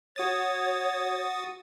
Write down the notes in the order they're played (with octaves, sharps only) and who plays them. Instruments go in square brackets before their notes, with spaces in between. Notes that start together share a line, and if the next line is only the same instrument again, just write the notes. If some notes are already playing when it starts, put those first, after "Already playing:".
[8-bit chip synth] F#4 D#6 A6 [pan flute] C#5